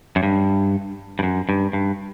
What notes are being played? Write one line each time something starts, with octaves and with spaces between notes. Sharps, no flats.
F#2
G2
G2
F#2
G2
G2